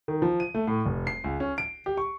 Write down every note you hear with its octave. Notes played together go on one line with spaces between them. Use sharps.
D#3
F3
D#7
A3
A2
F1
C7
C#2
C#4
D7
G4
C#6